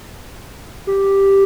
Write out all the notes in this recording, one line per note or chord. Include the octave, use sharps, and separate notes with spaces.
G4